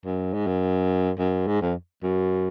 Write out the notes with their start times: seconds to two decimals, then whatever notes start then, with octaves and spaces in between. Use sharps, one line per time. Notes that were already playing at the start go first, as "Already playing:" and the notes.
0.05 F#2
0.33 G#2
0.47 F#2
1.19 F#2
1.47 G#2
1.61 F2
2.03 F#2